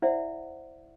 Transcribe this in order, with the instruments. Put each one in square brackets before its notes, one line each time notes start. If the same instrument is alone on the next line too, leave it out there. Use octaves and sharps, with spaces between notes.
[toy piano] E4 C5 D5 E5 F#5